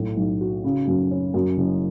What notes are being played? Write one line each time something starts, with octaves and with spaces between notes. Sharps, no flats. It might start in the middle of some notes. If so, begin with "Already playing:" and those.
Already playing: B1 A2
B1
F#4
C#3
F#2
C#4
F#2
F#1